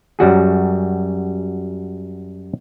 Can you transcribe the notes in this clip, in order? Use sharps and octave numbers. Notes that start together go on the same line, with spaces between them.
F#2 G3 F#4 G#4